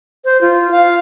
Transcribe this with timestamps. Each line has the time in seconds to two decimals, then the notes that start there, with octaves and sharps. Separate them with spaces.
0.25 C5
0.41 F4
0.71 F5